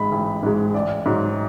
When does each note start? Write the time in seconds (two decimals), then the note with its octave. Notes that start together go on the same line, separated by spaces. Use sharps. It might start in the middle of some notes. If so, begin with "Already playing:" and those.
Already playing: A1 G#2 G#3 B5
0.12 A1
0.43 G#2 G#3
0.74 A1 D5
1.06 G#2 F#3